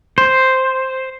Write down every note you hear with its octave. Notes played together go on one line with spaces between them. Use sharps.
C5